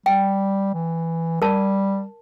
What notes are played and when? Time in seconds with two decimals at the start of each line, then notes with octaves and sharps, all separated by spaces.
0.06 G3 G5
0.74 E3
1.42 G3 A#4 A5